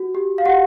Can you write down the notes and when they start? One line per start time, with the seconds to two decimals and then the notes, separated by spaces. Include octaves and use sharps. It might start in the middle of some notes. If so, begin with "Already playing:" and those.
Already playing: F#4
0.15 G4
0.38 F5
0.46 G4 F#5